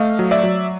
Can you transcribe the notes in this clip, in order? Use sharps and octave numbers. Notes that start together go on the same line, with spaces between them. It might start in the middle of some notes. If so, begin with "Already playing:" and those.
Already playing: A3 D#5 F5
F#3
D5 E5
F#3